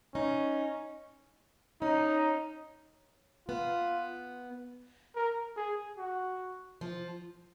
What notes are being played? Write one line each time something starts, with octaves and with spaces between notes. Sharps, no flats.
C#4 D#4
C#4 D#4
B3 F4
A#4
G#4
F#4
F3